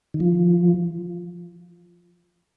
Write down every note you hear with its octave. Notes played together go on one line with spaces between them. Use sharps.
D#3
F3